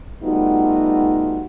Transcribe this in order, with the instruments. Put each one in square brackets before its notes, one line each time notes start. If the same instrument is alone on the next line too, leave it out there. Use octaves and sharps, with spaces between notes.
[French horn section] G3 A3 B3 D#4 F4 F#4